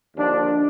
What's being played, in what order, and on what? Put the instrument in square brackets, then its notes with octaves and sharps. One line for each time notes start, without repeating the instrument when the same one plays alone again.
[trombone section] D#2 D3 F3 D4